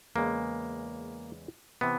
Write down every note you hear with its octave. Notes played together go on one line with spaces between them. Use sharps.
E2 C#3 E3 G#3 A#3
C3 E3 B3